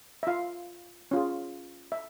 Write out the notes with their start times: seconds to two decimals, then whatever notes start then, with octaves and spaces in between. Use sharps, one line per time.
0.23 E5
0.27 F4 F5
1.11 C#4 F4 G#4
1.92 E5